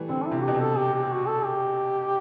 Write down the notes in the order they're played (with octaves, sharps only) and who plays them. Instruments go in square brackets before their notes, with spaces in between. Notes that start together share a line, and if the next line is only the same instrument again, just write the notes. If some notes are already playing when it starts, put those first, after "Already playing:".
Already playing: [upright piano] E3 G3 A3
[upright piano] D3 [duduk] C4
[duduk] D4
E4
[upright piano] C3
[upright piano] B2 [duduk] G4
[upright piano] C3
[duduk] A4
G4
G4
F#4
A4
G4